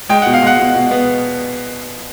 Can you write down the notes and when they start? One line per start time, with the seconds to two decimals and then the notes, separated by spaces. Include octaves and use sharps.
0.09 G#3 G5
0.22 B2 F#5
0.34 F5
0.42 G#3 F#5
0.58 B2
0.75 B2
0.91 B3